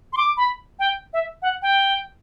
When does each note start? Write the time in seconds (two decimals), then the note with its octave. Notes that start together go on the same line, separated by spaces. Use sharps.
0.13 C6
0.17 D6
0.37 B5
0.79 G5
1.13 E5
1.42 F#5
1.62 G5